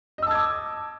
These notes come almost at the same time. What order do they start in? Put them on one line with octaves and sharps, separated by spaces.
D#5 E6 A5 G#6 D6